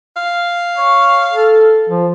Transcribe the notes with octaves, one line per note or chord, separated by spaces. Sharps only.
F5
C#5
A4
F3